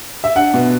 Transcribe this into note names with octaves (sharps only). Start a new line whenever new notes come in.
E5
D4 F#5
B2